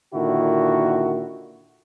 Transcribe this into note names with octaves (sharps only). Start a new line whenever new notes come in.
A#2 D3 D#3 E4 F#4